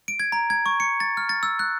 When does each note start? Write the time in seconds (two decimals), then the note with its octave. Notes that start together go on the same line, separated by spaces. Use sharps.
0.08 D7
0.20 G#6
0.32 A#5
0.50 G#6
0.66 C#6
0.80 C#7
1.00 A6
1.17 F6
1.29 A6
1.43 E6
1.59 F#6